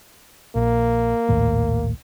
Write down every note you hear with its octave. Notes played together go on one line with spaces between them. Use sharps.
A#1 A#3
A#1 D#2 A2